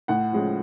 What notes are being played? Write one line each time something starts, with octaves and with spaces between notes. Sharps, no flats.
A2 F#5
F3 G#3 C#4